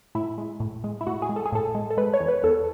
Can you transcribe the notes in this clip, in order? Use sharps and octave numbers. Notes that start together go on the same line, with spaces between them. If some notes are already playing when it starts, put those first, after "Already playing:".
A2 E4
G#3
A2
G#3
E4
A2 F#4
G#4
G#3
A4
G#4
A2 A4
G#3
A4
G#3 B4
C#5
E2
B4
E2 A4